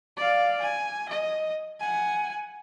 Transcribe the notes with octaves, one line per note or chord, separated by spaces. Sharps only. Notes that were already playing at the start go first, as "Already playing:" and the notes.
D5 F5
G#5
D#5
F#5 G#5